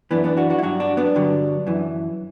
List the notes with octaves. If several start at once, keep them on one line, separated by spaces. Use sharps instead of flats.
F#2 E3 B3 D4
B3 D4
D4 F#4
D4 F#4
E4
G2 F#3 D4 F#4
D4 F#4
B3 D4
G2 D3 F#3
F#2 E3